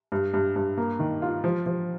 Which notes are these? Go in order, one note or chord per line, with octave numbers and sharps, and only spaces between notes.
G2
G2
G2
A#3
D#3
F4
F3
F3